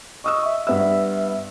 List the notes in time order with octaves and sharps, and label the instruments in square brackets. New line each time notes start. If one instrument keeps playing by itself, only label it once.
[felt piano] D#5 D#6 E6 [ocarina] C#6
[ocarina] E5
[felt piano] G2 B3 E6 [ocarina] E5